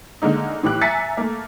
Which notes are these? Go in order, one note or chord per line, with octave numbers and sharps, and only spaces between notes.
D3 G#3 A#3 D#4
A2 E3 G4 D6 F#6
E5 G#5 A#5 A6 B6 C#7
A3 A#3